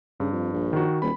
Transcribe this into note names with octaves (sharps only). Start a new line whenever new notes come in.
G2 C#3
F2
A#1
D#3 F#4
D#1 B5